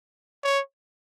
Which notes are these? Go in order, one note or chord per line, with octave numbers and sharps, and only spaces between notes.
C#5